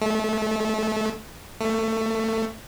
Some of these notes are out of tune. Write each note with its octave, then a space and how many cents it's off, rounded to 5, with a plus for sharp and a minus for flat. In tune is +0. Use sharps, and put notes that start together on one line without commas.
A3 -25
A3 +20